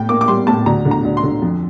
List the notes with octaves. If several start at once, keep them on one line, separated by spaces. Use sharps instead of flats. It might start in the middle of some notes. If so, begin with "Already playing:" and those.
Already playing: A2 G5
A#3 D6
D6
G3 C6
A2 A5
D2 A#5
D3
A#5
D2
C6
D3
F2